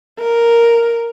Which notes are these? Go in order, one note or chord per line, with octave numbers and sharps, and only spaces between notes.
A#4